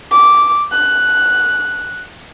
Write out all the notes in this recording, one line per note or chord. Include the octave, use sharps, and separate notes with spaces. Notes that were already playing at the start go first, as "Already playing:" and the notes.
D6
F#6